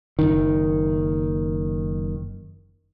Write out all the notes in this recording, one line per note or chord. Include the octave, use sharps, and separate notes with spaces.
F#1 B1 D#3